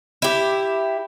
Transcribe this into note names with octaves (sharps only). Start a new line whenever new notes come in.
E4 G4